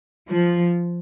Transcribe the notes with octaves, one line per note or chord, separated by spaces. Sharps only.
F3